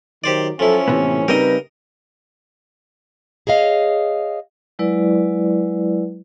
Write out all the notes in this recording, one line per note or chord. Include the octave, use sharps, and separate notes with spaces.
D#3 F#3 G4 C5 D5
F3 F#3 C#4 E4 A4
A2 C3 E3 B3
C#3 G3 C4 D#4 A#4 B4 D#5
G#4 C#5 D#5 F5
F#3 G#3 E4 B4 D5